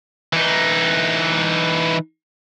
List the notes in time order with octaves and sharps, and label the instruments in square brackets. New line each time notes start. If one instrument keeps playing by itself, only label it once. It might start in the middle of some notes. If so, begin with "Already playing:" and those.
[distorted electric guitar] E3 D#4